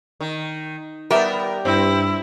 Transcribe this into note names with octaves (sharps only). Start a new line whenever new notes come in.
D#3
G3 B3 G4 A#4 E5
G2 C4 E4